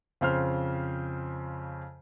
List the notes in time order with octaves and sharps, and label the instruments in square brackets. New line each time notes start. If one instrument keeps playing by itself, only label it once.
[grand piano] F2 C#3 C5 F6